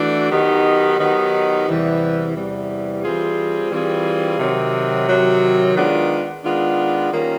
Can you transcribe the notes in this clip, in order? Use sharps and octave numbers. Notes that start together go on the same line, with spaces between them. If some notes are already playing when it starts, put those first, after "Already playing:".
Already playing: E3 A3 D4 F#4
D#3 F#3 B3 D#4 G4
D#3 F#3 B3 D#4 G4
E2 C3 E3 G3
E2 C3 E3 G3
E3 G3 C4 F4 G#4
E3 G3 C4 F4 G#4
C3 D#3 F#3
C3 D#3 F#3
D#3 G#3 B3 D4 F4
D#3 G#3 B3 D4 F4
D#3 G3 A#3 C#4 F4